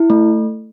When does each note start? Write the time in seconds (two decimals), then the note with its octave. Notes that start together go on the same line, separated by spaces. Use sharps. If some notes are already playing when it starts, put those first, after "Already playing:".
Already playing: E4
0.10 A3